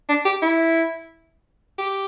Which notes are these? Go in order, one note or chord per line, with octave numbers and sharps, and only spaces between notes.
D4
G4
E4
G4